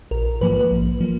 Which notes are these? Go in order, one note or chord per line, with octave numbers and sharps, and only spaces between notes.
A#1 A#4
G#2 F3 A#3 B4
A#1
F3 A#3